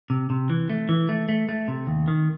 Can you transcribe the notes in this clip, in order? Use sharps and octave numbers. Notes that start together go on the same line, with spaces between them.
C3
C3
E3
A3
E3
A3
A3
A3
C3
D#2
D#3